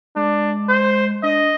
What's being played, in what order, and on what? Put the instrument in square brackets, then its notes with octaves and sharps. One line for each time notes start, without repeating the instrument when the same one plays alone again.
[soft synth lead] G#3 [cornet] D4
[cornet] C5
[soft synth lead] D4 [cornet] D#5